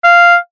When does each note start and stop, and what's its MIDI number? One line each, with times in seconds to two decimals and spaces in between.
0.04 0.36 77